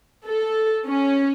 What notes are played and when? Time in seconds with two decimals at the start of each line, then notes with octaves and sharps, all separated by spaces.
0.25 A4
0.86 C#4